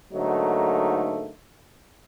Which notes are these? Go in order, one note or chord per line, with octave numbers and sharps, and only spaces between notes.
G#2 D3 F#3 A3 A#3 D#4